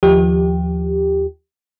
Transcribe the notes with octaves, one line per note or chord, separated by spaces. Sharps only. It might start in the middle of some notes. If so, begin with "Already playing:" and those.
D#2 F3 G4